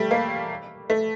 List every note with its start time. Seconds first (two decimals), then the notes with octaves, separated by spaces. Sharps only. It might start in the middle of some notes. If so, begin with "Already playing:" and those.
Already playing: G3 A3
0.11 A#3
0.90 A3